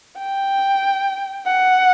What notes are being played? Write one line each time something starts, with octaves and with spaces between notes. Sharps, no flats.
G5
F#5